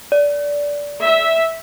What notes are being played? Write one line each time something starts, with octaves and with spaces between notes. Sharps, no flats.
D5
E5